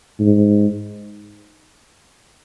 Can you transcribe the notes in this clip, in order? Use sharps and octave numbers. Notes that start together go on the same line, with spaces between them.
G#2